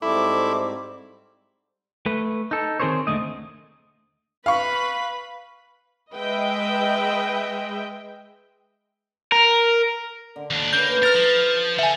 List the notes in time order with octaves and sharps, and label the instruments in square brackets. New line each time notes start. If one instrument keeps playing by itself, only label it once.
[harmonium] G#2 G3 C4 [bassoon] A3 [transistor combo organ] E4 [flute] D6
[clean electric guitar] A3 B4
D#4 A4
D#3 C4 G#4 A#4 C5 C#5
D#2 B2 D3 A3 D#5
[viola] B4 B5 [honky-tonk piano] F5 C#6
[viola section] G#3 B4 D#5 E5 G5
[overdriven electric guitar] A#4
[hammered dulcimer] D3
[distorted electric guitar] D#2 D4
[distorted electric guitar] A#3 [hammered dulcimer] C#4 B4 [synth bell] G6 G7
[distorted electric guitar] A#4 [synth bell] F6 A6
[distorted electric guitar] F3
[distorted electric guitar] A4 F#5 [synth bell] E5 G#5